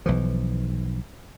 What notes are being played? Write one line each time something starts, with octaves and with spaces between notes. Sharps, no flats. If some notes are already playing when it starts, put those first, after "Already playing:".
B1 E3 F3